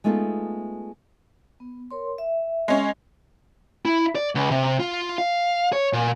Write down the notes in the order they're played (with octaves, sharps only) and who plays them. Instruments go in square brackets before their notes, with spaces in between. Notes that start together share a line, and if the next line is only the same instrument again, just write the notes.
[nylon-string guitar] G#3 A3 B3 D#4 F4 A4
[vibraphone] B3
A#4 C#5 C6
E5
[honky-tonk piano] G#3 C#4
[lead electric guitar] E4
D5
C#2
C3
F4
F5
C#5
A#2